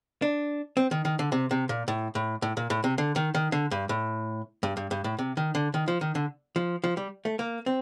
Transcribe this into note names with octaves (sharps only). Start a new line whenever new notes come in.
D4
C4
D#3
D#3
D3
C3
C3
A#2
A2
A2
A2
A#2
A2
C3
D3
D#3
D#3
D3
G2
A2
G2
G2
G2
A2
C3
D#3
D3
D#3
F3
D#3
D3
F3
F3
G3
A3
A#3
C4